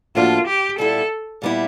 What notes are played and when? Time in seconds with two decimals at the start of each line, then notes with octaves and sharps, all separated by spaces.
0.15 A2 F3 A#3 D4 F4 F#4
0.48 G4
0.78 A#2 G3 B3 E4 A4
1.42 A#2 G3 B3 E4